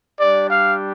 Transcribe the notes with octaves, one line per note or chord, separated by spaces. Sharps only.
G3 D4 G4 D5
F5